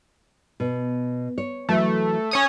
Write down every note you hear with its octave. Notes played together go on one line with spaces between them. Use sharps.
B2
C#5
E3 F#3 A3
C#4 C#5 D#6